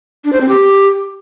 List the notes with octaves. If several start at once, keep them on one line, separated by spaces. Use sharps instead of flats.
D4
C5
C4
G4